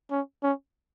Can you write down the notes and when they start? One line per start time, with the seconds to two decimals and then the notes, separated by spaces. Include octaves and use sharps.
0.11 C#4
0.43 C#4